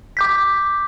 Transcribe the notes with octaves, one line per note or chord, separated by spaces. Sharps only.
D6 G6 B6